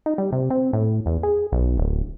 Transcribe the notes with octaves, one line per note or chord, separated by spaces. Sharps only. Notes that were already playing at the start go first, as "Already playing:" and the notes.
D#4
G3
C3
C4
A2
E2
G#4
B1
D1